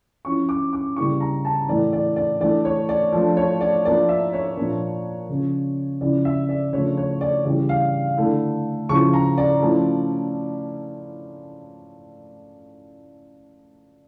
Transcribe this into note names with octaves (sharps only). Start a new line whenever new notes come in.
F3 C#4 E4 C#6
D6
D6
C#3 G3 A#3 E4 C#6
A#5
A5
A2 E3 A3 D5
D5
D5
E3 A3 D4 D5
C#5
D5
F3 A3 D4
C#5
D5
F3 A#3 D4 D5
E5
C#5
A#2 F3 A#3 D4
C#3 F3 C#4
C#3 F3 C#4 E4 D5
E5
D5
C#3 F3 A3 D4 C#5
C#5
D5
C#3 E3 G3 D5
F5
D3 A3 E4
C#3 F3 C#4 E4 C#6
A#5
D5
F3 A3 C#4 E4